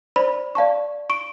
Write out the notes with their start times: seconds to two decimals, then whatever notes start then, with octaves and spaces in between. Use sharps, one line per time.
0.16 C5 D5 B5
0.55 D5 F5 A5 C#6
1.10 C#6 D7